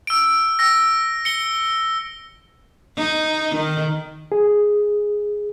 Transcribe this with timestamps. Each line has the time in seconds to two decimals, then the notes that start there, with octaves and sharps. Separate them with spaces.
0.07 E6 D7
0.59 E6 A#6
1.25 C#7 G7
2.97 D#4
3.56 D#3
4.32 G#4